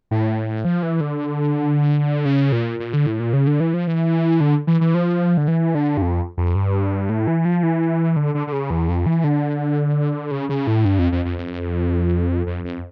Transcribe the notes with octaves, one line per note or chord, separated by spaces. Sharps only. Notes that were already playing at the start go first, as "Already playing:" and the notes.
A2
F3
E3
D3
C#3
A#2
A#2
D3
A2
A#2
C#3
D3
E3
F3
E3
D3
E3
E3
F3
D3
E3
D3
G2
F2
F2
G2
A2
E3
F3
E3
D3
D3
D3
C#3
E2
F2
E3
D3
C#3
C#3
A2
G2
F2
F2
F2
F2
F2
F2